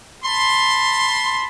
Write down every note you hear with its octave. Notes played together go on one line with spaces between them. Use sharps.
A5 B5 C6